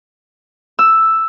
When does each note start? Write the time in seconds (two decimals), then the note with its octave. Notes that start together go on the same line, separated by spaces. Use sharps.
0.79 E6